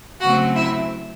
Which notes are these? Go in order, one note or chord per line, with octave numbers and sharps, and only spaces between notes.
C#3 F#3 A3 C4 F#4 F#5
E4 E5